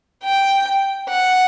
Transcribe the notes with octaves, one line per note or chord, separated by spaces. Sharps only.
G5
F#5